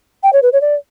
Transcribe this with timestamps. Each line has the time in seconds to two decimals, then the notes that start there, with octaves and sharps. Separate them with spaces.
0.23 G5
0.33 C#5
0.42 B4
0.53 C#5
0.61 D5